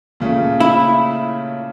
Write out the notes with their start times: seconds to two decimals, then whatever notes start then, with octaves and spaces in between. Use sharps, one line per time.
0.20 A#2 C#3 A3
0.60 E4